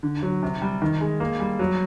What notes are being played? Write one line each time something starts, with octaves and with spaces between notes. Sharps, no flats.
D3
F#3
C3
G3
D#3
G#3
A#3
G3
F#3